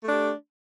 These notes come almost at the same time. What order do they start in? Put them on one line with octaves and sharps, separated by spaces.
A3 D4 G4